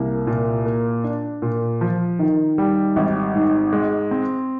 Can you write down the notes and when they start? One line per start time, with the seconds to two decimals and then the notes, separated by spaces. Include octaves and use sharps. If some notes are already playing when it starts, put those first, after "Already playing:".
Already playing: C2 A#3
0.27 A#2
0.66 A#3
1.04 D4
1.42 A#2
1.81 F3
2.19 D#3
2.58 G3
2.96 G#1
3.35 G#2
3.73 G#3
4.11 C4